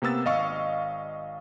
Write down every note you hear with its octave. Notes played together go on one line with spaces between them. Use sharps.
C3 A#3 B3 E6 A6
G#1 D#5 F5 C#6